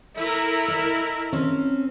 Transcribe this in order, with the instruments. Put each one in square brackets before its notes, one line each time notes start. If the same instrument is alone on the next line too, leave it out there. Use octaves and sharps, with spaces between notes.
[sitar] A3 [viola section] E4 A#4
[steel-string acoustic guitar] D#5
C4 C#4